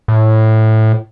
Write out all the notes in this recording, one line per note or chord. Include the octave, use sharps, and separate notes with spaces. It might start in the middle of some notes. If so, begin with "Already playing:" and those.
A2